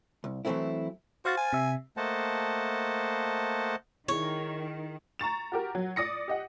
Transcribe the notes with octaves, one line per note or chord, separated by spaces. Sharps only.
C2
E3 F#3 G3 A3 C4 E4
F#4 C5 F5 A6
G#5
C3 E5
A3 A#3 C5 D#5 F#5 A5
D#3 E4 G#4 C#5
A#5 C#6 A6 E7
F#4 G4 A#4
F#3
D5 D#6 A#6 C#7
G4 D#5 F#5